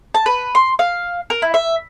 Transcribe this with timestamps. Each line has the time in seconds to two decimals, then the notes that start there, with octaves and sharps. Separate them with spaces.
0.15 A5
0.26 B4
0.55 C6
0.79 F5
1.30 A#4
1.42 E4
1.54 E5